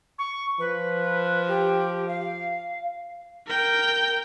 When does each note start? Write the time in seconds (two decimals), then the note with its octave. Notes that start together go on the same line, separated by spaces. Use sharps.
0.18 C#6
0.60 F3 B4
1.48 G4
2.08 F5
3.47 A#4 G5